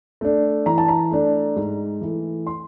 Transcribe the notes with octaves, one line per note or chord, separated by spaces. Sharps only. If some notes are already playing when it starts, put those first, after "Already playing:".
A3 D4
E3 A#5
A5
A#5
A3 D4
G#2
E3 A3
C6